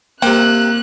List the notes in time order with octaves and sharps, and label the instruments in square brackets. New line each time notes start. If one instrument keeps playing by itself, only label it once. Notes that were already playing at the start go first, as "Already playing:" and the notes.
[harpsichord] C3 C5 [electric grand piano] A#3 [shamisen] G5 [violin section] F#6